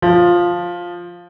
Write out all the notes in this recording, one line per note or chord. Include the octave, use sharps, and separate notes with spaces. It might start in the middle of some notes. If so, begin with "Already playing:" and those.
F3